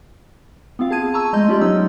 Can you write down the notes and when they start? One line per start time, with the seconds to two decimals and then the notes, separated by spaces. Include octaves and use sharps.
0.79 B3 C4 F4 F5
0.91 G#4 A5 G#6 D#7
1.14 A5 A#5 C#6 E6
1.33 G#3 A3 D#5 C6 G6
1.48 G#3 C#4 F4 G4 D5 D#5
1.61 F#3 B3 D#4 C#5 E6